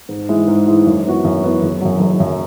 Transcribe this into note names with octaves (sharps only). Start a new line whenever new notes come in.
G#2
E3 G#3 E4
G#2
E3 G#3 E4
F#2
E3 B3 F#4
F#2
E3 B3 F#4
F#1
F#2 F#3
F#1
F#2 F#3